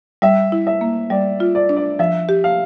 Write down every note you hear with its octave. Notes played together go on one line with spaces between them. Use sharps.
G3 E5
E4
E5
A#3
G3 D5
F4
D5
D4
D5
F3 E5
G4
F5